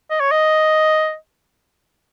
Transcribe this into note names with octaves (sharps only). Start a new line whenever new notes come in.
D#5
C#5
D#5